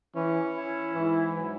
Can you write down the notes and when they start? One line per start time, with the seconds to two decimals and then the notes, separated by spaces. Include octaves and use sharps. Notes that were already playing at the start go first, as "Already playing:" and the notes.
0.15 E3 C#4
0.55 E4
0.93 G#2 E3
1.32 F#3